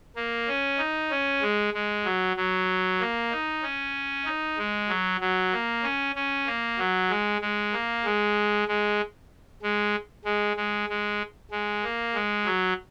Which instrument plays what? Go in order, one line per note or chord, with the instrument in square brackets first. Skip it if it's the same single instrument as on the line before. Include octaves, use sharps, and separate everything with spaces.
[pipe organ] A#3
C#4
D#4
C#4
G#3
G#3
F#3
F#3
A#3
D#4
C#4
D#4
G#3
F#3
F#3
A#3
C#4
C#4
A#3
F#3
G#3
G#3
A#3
G#3
G#3
G#3
G#3
G#3
G#3
G#3
A#3
G#3
F#3